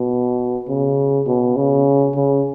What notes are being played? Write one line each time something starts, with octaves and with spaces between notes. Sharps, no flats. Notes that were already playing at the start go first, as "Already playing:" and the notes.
Already playing: B2
C#3
B2
C#3
C#3